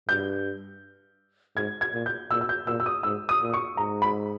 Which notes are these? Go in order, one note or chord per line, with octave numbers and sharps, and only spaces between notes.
G2 G6
G#2 G#6
G#6
A#2
G6
A#2 E6
E6
G6
A#2 E6
E6
D#6
G#2 E6
D#6
A#2
C#6
G#2 A#5
B5